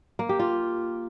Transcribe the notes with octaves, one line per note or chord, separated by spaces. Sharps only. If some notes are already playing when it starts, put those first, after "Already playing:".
A#3
G4
F4